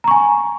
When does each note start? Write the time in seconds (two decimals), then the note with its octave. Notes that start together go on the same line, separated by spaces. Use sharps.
0.04 A#5
0.08 C#6
0.11 G#5